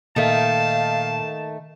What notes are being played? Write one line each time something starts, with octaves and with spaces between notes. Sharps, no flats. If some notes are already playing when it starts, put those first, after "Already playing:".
A#2 D#3 A3 A#3 A4 F5 A5